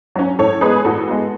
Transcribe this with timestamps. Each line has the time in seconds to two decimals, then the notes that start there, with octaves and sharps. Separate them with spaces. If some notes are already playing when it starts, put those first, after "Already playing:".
0.16 F#3 C#4
0.39 A2 A4 C#5
0.61 G#3 B3 G#4 B4
0.85 A2 F#4 A4
1.08 G#3 B3